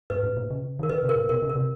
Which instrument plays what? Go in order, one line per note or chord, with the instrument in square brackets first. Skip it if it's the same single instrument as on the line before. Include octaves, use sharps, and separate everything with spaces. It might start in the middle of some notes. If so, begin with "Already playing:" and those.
[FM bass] G#2 [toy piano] B4
[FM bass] A2
A#2
C#3
[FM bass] D#3 [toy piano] A#4
[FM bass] D3 [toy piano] B4
[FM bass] C3
[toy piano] A#4
[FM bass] A#2
[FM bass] B2 [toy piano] A#4
[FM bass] C#3
[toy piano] A#4
[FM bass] C3